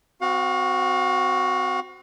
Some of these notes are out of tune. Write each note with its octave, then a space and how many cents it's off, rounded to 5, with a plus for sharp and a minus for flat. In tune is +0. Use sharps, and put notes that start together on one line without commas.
C4 -20 F#4 +0 F5 +40